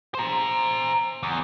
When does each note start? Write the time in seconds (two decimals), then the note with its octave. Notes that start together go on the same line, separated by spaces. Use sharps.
0.15 C5 A#5
1.23 E2